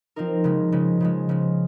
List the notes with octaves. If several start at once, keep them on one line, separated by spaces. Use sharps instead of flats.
F3 C4 D#4 A#4
C#3 F3 G#3
C#3 F3 G#3
C#3 F3 G#3
C#3 F3 G#3